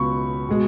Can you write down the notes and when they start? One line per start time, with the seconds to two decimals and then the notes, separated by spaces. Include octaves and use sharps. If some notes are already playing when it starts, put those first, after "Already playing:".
Already playing: C#2 B2 F#3 B3 B5 C#6
0.49 B2 G#3